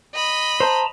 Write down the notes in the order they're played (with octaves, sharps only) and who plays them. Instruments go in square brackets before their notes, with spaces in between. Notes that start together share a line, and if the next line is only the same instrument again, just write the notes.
[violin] D#5 B5
[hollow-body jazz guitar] C5 [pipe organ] A5 A#5